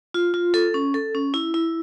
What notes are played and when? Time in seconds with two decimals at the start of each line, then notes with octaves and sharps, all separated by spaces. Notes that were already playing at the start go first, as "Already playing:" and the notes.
0.14 F4
0.34 F4
0.54 A4
0.74 C#4
0.94 A4
1.15 C#4
1.34 E4
1.54 E4